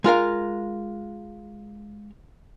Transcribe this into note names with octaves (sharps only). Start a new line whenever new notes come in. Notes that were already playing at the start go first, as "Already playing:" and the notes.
G#3 F4 A#4 F5